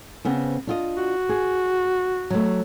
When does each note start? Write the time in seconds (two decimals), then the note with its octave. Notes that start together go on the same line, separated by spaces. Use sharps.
0.25 C#3 B3 C4
0.67 D4 F4 D#5
0.97 F#4
1.29 G#4
2.30 F#3 A3